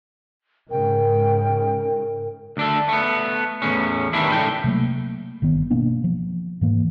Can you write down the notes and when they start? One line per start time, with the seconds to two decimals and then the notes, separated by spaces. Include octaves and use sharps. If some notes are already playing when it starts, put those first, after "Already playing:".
0.70 G#2 C#3 A#4 G5
2.57 D2 D4 A4
2.89 A3 B3
3.62 E2 A2 C#4
4.13 D#3 E3 G3 D4 E4
4.32 C#2 A2 A3 G5
4.64 C3 F#3 A3 A#3
5.42 G1 D#3 B3
5.71 B2 A#3 B3 D4
6.04 F3
6.61 G#2 E3 A#3